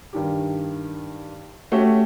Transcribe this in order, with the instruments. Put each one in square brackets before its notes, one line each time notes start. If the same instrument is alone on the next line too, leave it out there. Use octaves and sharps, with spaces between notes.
[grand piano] G2 D#3 G4
A3 C#4 F#4 G4 E5